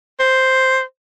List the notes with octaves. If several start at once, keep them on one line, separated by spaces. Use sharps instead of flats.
C5